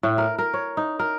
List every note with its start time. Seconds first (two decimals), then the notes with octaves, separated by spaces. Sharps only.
0.03 A2
0.18 A#4
0.38 A#4
0.53 C#5
0.77 D#4
0.99 A#4